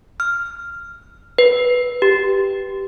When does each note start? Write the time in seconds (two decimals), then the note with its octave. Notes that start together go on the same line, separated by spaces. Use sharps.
0.20 F6
1.38 B4
2.02 G4